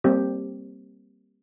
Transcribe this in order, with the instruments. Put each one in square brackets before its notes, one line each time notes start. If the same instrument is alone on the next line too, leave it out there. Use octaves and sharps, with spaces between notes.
[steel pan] G3 A#3 C4 G4